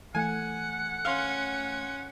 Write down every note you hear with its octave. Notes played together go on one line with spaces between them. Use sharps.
E3 A3 F#5 G#5
C#4 F5 C6